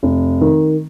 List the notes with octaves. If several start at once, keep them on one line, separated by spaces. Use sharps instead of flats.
F1
D#3